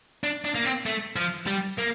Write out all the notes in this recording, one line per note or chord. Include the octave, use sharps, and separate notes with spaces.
D4
D4
A#3
C4
A3
F3
G3
A#3